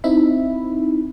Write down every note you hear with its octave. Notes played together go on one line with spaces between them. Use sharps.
C4 D#4 E4 E5 B5